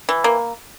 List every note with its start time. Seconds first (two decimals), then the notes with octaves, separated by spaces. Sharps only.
0.09 E3
0.24 A#3